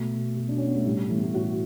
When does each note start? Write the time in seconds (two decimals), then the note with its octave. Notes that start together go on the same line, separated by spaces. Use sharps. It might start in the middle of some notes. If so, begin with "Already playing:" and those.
Already playing: B2 A3
0.36 B2
0.49 D4
0.58 C#4
0.66 B3
0.76 A3
0.85 A2 G3
1.09 E3 A3
1.16 B3
1.23 A3
1.34 A2 F#4